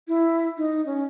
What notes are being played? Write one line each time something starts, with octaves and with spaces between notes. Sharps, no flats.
E4
D#4
C#4